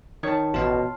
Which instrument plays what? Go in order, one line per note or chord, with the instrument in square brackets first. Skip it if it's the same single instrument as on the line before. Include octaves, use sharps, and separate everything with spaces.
[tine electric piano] D#3 [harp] C#5 A5
[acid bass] A1 [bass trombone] B2 [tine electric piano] F4 F5